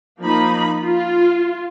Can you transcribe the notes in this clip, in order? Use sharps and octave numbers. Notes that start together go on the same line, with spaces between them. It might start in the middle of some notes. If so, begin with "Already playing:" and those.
F3 A#3 D#4 B5
F4